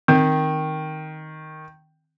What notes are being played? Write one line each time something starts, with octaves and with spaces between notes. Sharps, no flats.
D#3 C4